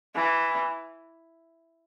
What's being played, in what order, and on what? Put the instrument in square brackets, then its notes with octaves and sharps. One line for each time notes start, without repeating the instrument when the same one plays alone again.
[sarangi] E3